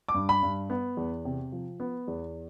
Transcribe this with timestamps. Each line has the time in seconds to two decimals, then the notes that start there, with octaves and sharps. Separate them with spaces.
0.09 D6
0.14 G2
0.29 B5
0.43 G2
0.70 B3
0.97 E2
1.25 C3
1.52 F3
1.80 B3
2.08 E2